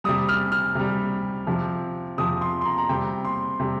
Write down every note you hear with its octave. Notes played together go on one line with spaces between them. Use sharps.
C3 G3 D#6
F6
F6
C3 G3
C3 F3
C3 F3 D#6
C6
C6
A#5
A#5
C3 G3 G5
C6
C3 G3